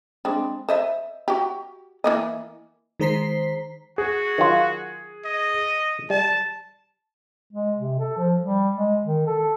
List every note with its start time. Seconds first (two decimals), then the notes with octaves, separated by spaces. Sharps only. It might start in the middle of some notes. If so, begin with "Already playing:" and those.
0.25 G#3 C4 D4
0.69 C5 D#5 E5
1.28 F#4 G4
2.04 E3 A#3 D#5
3.00 D#3 G#3 C5 A#5 B6 C7
3.98 F#4 G#4
4.38 D#3 F#3 F4
5.25 D#5
6.10 G3 A5
7.53 G#3
7.78 C3
8.00 A4
8.18 F3
8.41 G3
8.75 G#3
9.05 D#3
9.27 A4